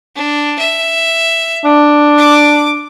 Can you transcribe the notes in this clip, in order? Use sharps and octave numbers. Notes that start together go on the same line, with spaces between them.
D4
E5
D4
D6